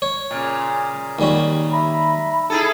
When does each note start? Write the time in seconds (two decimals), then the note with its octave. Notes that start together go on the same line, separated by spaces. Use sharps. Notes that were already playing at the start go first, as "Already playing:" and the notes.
0.02 C#5
0.31 A#2 C#3
1.19 D#2 G3 F#4
1.72 E5 A#5 B5
2.50 D#4 E4 G#4 A4